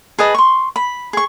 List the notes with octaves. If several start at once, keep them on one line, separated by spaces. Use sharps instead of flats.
G#4 B4 D#5 A5
C6 C#6
B5
G#4 C#6